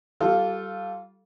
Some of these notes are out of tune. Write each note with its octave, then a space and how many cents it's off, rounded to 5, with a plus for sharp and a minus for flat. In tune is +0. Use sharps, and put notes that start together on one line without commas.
G3 -25 F4 +0 A4 +0